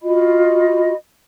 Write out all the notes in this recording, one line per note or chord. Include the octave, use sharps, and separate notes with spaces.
F4 F#4 D#5 B5